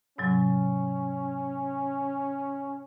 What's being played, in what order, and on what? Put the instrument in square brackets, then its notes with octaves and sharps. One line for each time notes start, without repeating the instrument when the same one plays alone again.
[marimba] G#2 C3 F#3 [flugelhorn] C#4